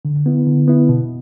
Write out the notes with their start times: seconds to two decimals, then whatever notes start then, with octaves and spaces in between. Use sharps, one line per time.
0.05 D3
0.26 B3 E4
0.47 D3
0.68 B3 E4
0.89 B2